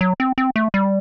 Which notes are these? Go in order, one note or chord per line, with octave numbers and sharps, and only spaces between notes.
F#3
C4
C4
A3
G3